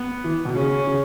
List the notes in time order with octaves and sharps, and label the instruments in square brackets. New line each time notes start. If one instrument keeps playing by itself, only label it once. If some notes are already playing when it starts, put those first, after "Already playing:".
Already playing: [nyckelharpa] B3
[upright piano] E3
B2
[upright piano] C#3 [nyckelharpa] C#4
[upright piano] C#3